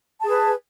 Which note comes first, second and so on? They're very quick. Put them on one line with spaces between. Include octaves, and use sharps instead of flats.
A5 G#4 B4